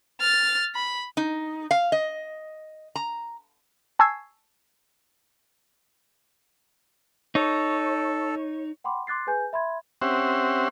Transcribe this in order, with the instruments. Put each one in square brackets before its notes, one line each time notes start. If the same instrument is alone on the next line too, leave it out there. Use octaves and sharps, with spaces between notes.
[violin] F6 A6
B5
[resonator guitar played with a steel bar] D#4
F5
D#5
A#5
[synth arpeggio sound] G#5 A5 C#6 E6 G#6 C7
[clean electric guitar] D#4 [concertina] A4 [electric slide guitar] C#5
[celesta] F#5 G5 B5 C6 D6
C6 D6 F#6 A6 C7
G#4 B4 G#5 G6
E5 B5 C6 G#6
[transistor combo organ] C4 C#4 G4 C5 E5 F#5